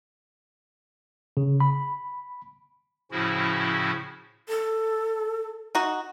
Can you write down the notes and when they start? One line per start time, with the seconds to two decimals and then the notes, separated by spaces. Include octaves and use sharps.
1.37 C#3
1.60 B5
3.11 A2 C#3 F3 C#4 E4 F#4
4.49 A4
5.75 D#4 F#4